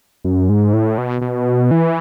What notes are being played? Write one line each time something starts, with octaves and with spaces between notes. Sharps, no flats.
F#2
G#2
A2
B2
B2
E3